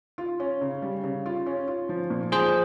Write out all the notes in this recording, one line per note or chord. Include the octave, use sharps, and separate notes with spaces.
F4
C#4
C#3
G3
C#3
F4
C#4
F4
F3
A#2
F3 G#4 C5